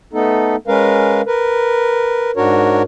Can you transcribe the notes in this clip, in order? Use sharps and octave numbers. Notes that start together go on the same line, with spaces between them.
A3 B3 D#4 A4
G#3 C#4 A#4 B4 F5
A#4 B4
G#2 D4 F#4 A#4 C#5